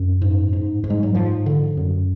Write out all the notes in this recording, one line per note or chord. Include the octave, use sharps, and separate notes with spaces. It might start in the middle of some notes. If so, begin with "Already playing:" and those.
Already playing: F#2
G#2
G#2
G#2
G#3
F#3
G#2 F3
D3
F#2